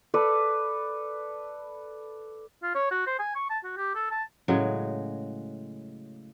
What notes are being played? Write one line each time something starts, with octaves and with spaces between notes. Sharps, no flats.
A4 B4 D5
F4
C#5
F#4
C5
G#5
C#6
A5
F#4
G4
A4
A5
A2 C#3 F#3 G#3